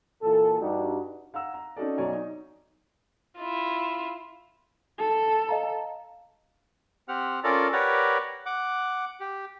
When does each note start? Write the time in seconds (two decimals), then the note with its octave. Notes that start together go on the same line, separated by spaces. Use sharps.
0.23 A#2 E3 A4
0.60 G2 G3 D4 D#4 F#4
1.34 F5 F#5 A#5 E6
1.54 A#5
1.76 C#4 D#4 F#4 A4 D5
1.98 B1 F#3 C#5 D5 G#5 A#5
2.13 D#4
3.39 E4 F4
4.99 A4
5.49 D#5 F5 A#5
7.08 C4 G4 F#5 F6
7.44 C#4 F4 A4 A#4 D5
7.73 G4 A#4 B4 C#5 D5 F#5
8.46 F#5 D6
9.20 G4